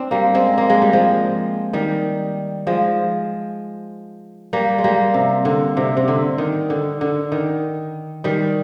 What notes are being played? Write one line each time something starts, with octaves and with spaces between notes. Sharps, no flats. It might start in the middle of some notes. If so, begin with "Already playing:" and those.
Already playing: C4 D4
G3 A#3
G#3 C4
A#3
G#3
G3
F3 G#3
D#3 G3
F3 G#3
G3 A#3
G#3
G3 A#3
C3
D3
C3
C3
D3
D#3
D3
D3
D#3
D#3 G3